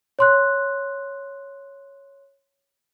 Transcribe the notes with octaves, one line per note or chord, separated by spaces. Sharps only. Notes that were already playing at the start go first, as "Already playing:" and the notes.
C#5 C6 F#6